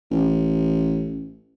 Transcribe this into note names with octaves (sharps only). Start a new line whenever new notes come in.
A1